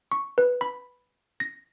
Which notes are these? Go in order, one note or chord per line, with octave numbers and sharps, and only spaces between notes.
C#6
B4
B5
A#6